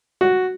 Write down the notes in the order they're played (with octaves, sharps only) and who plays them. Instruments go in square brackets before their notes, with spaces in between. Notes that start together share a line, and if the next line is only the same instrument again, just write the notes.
[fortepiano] F#4